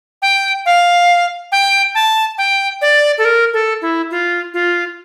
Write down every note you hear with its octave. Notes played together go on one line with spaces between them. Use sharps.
G5
F5
G5
A5
G5
D5
A4
A#4
A4
E4
F4
F4